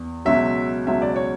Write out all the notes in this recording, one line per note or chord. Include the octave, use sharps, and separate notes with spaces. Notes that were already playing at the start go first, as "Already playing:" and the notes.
Already playing: E2
C#2 B2 F#3 E5
C#2 B2 F#3 E5
D5
C#5